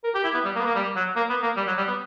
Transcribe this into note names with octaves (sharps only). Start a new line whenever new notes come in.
A#4
G4
E4
B3
G3
A#3
B3
A#3
G3
F#3
A#3
B3
A#3
G3
F#3
G3
B3